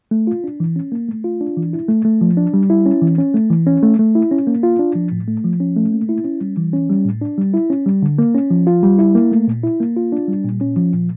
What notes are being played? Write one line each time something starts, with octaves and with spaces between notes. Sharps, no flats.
A3
F4
D4
E3
C#4
A#3
A3
F4
D4
E3
E4
A3
A3
F3
D4
G3
E4
C#4
E3
C#4
A3
E3
C#4
A3
A3
E4
C#4
A#3
F4
D4
F3
A2
A3
F3
C#4
A3
A#3
E4
C#4
G3
E3
C#4
G3
A2
D4
G3
E4
C#4
G3
D3
A#3
C#4
F3
F4
G3
E4
A#3
A3
A#2
E4
A#3
F4
D4
G3
A#2
C#4
F3
A#2